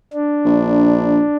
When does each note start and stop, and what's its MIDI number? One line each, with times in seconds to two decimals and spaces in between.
0.14 1.37 62
0.45 1.22 34